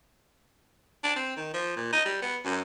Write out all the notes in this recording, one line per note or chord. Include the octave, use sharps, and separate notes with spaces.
D4
C4
D#3
F3
A#2
D#4
G3
B3
F#2